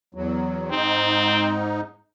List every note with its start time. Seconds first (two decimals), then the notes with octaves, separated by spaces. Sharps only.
0.15 E2 F#3
0.71 G#2 C4 D#4